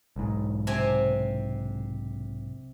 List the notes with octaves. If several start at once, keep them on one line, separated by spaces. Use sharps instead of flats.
B1 G#2
C3 C4 G#5